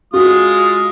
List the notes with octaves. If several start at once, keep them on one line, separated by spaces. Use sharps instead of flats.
G#3 F4 F#4 D#6